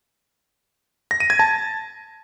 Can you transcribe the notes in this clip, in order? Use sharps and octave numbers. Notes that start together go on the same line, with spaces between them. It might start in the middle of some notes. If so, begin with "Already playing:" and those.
A#6
D#7
G#6
A5